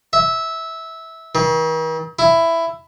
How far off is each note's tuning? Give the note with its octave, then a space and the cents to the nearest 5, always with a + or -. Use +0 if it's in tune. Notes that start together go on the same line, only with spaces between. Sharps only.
E5 -15
D#3 +45
E4 +10